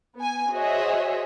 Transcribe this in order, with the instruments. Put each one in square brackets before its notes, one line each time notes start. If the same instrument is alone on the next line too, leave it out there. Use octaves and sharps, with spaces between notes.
[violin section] B3 G#5
F#4 G#4 C5 C#5 D#5 E5